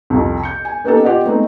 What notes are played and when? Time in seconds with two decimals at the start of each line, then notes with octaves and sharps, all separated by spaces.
0.10 C2 F2
0.43 G6 C#7
0.65 G#5
0.84 A#3 B3 C#4 D#4 G4 A4
1.04 F4 G4 D5 D#5 F#5
1.25 G#3 A3 B3 C4 D#4